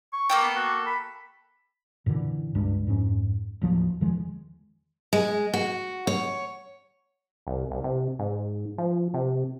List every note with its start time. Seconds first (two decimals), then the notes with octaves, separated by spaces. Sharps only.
0.13 C#6
0.30 A#3 A4 G5
0.42 B3
0.56 F#4
0.86 B5
2.06 F#2 A#2 D3 E3
2.55 C#2 G2 G#3 D4
2.87 F2 G#2 C4 C#4
3.62 A1 D#2 F3 F#3
4.01 E2 D#3 F3 G#3
5.13 G#3
5.54 F#4
6.07 C#5
7.47 C2
7.71 C2
7.84 C3
8.19 G#2
8.78 F3
9.14 C3